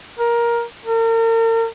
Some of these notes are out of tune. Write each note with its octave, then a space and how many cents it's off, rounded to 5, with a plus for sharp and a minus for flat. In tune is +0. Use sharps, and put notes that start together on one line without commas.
A#4 +15
A#4 -40